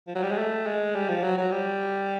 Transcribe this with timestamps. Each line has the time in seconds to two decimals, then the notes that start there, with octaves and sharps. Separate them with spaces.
0.07 F3
0.15 F#3
0.23 G3
0.31 G#3
0.38 A3
0.66 G#3
0.95 G3
1.09 F3
1.23 F#3
1.38 F#3
1.52 G3